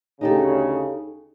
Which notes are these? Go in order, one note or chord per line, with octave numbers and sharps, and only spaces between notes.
D2 C#3 D#4 G4 A4